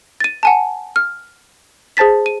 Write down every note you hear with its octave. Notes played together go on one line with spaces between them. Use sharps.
A6 D#7
F#5 G#5 A5
F6
G#4 C5 A5 A6 B6
D#7